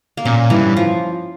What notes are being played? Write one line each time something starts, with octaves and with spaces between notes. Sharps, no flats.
A#3
A#2 C#4
G2 E3
F3